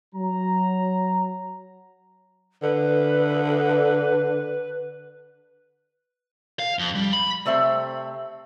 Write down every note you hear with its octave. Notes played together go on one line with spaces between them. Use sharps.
F#3 A#5
D3 B4
F5
F2
G3
B5
C3 A3 C5 E5